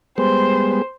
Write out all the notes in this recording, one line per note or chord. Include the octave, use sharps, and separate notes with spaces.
G3 G#3 B3 C5